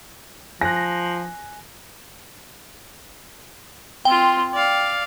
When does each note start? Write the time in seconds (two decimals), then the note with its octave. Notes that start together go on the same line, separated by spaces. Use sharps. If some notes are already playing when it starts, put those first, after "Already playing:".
0.61 F3 G#5 F#6 A#6
4.05 C4 F4 G5
4.54 D5 F5